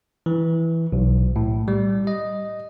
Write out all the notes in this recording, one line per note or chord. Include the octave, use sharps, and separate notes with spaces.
E3
B1
A2
G3
D#5